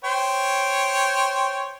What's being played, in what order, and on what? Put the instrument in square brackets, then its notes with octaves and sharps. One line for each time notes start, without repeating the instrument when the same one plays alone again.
[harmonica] C5 C#5 G5